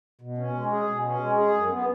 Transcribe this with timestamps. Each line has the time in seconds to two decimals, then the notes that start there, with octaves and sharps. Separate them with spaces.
0.21 B2
0.38 C#4
0.54 G#3
0.71 G#4
0.87 B2
1.04 C#4
1.20 G#3
1.37 G#4
1.54 F#2
1.70 B3